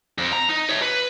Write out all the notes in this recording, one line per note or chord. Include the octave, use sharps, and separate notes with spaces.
F2
A#5
D#4
C#5 E5
B4